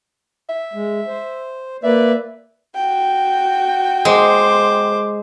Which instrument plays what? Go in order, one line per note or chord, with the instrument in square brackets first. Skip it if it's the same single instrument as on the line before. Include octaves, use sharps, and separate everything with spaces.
[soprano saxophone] E5
[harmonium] G#3
C5
[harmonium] A#3 B4 D5 [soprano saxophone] E5
[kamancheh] F#4 G5
[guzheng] G#3 [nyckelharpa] C5 D6